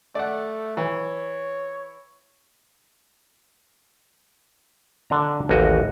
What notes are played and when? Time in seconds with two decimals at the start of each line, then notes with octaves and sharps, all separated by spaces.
0.15 A3 D5 F#5
0.77 E3 C#5
5.10 D3 D4 A#5
5.49 A1 D#2 F#4 D#5